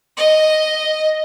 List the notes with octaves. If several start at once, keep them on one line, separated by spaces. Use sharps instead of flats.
D#5